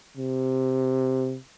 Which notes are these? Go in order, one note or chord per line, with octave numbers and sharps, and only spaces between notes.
C3